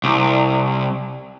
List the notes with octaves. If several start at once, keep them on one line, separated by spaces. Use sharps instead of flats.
C2